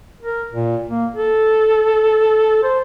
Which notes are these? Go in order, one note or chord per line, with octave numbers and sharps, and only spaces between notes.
A#4
A#2
A#3
A4
C5